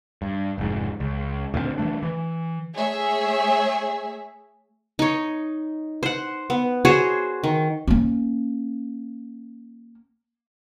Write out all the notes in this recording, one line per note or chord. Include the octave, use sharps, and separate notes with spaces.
G2
F1 G#2
C#2
D2 A#2 F#3 C4
E3 F3 A3 D4
E3
A3 G#4 C#5 E5
D#4 C#5
C5 F#5
B3
F#4 G#4 C5 C#5
D#3
A#3 C#4